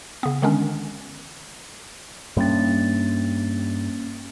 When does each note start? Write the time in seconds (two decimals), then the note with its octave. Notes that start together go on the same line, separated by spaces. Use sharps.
0.23 C#3 B3
0.42 D3 D#3 G#3 B3 C#4 D4
2.37 G2 G3 A#3 C#4 A6